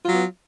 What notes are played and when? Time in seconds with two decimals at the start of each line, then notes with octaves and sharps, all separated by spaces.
0.04 F4
0.08 F#3
0.12 B3